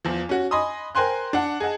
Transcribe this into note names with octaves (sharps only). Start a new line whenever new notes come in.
E2 F3
C#4 F#4
D#5 G#5 B5 C6 D#6
A#4 C5 G5 G#5 C6 F#6
D4 F#5
G#4 D#5 F#5 A5